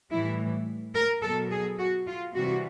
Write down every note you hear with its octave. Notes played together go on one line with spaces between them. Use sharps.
A2 E3 G3 E4
A#4
B2 F#3 A4
G#4
F#4
F4
C3 E3 G3 F#4